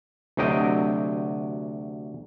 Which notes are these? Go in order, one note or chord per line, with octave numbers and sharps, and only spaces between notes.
D2 C3 F#3 D#5 G5